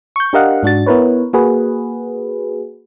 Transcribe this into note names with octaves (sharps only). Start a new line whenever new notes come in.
C#6 G6
D4 G4 A#4 D#5 F5 F#5
G#2 D4 F#4 A6
B3 E4 A#4 B4 C#5
A#3 F#4 G#4 B4